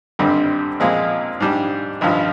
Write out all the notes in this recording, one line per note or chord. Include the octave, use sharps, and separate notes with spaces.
G#1 G2 D3 G3 C4
A#2 F3 G#3 C4
G#2 G3 D4
G#1 G2 F3